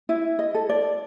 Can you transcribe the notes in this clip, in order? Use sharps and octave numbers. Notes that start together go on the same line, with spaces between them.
E4 E5
D#5
A4
D5